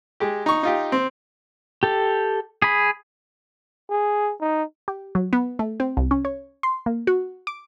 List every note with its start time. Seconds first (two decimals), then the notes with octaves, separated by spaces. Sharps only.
0.20 G#3 G4
0.46 D#4 C#6
0.63 D#4 F4 G4
0.92 C4
1.83 G4 A4
2.62 G#4 B5
3.90 G#4
4.41 D#4
4.88 G4
5.15 F#3
5.33 B3
5.59 A3
5.80 C4
5.97 C2
6.11 C#4
6.25 C#5
6.63 C6
6.86 A#3
7.07 F#4
7.47 D6